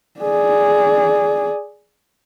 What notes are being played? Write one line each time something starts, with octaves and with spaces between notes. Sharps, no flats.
G#4 D5